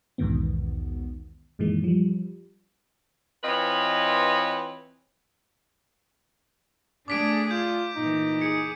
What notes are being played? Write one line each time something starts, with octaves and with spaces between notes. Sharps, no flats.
B1 E2 G#2 B2 D#3 B3
F#2 A#2 D#3 E3 G#3
F3 G3
E3 C4 F4 B4 C#5 D#5
A3 D4 G#4 D5 D6 B6 D7
F4 G6
A#2 E3 D#4
G#4 C#7